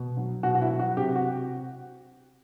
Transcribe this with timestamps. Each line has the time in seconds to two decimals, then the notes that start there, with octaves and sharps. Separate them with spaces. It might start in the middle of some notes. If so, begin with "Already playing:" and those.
Already playing: B2
0.17 F#3
0.43 B2 F#4
0.55 F#4
0.61 E4
0.71 F#3
0.79 F#4
0.97 C3 G4
1.16 F#4